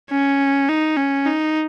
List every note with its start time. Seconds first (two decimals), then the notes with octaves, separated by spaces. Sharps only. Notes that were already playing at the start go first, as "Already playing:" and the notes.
0.11 C#4
0.69 D#4
0.97 C#4
1.26 D#4